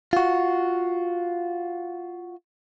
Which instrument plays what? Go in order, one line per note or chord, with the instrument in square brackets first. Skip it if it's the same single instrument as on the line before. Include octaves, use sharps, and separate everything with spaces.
[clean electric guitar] F4 F#4